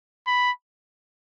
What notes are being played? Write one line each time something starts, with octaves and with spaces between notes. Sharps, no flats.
B5